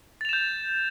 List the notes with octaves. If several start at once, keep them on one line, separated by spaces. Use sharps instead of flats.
G6 A6 E7 F7